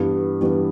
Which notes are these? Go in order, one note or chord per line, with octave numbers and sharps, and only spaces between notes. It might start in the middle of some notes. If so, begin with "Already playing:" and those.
Already playing: G2 E3 G3 B3
G2 E3 G3 B3